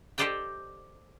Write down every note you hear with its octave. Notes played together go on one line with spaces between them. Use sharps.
G4 A4 C5 D5 D#5 G5